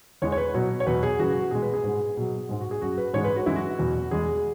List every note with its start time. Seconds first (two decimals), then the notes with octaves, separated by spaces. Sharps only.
0.22 E2 E3 G#3 C#5
0.32 C#5
0.37 B4
0.54 B2 F#3 C#5
0.80 C#5
0.87 E2 B2 F#3 B4
1.03 G#4
1.19 F#2 C#3 E3 F#4
1.35 F#4
1.51 B2 G#3 G#4
1.62 B4
1.73 G#4
1.84 G#2 G#3
2.17 B2 F#3
2.49 G#2 G#3
2.60 F#4
2.71 G#4
2.82 F#2 F#3 F#4
2.98 B4
3.14 G#2 E3 G#3 C#5
3.24 B4
3.36 F#4
3.46 F#2 E3 G#3 E4
3.56 F#4
3.79 E2 B2 F#3
4.11 E2 E3 G#3 G#4